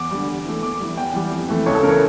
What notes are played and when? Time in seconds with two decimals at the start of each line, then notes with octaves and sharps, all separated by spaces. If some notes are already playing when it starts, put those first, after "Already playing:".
Already playing: E2 D6
0.11 D3 G3
0.27 E2
0.46 E3 A3
0.62 E2 D6
0.79 E3 G3
0.97 E2 G5
1.14 E3 G3
1.31 F2
1.48 E3 A3
1.66 C#2 C#5
1.75 A4
1.83 C#3 A#4
1.86 E3 C#5